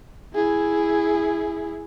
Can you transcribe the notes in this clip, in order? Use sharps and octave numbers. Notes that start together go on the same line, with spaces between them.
E4 G#4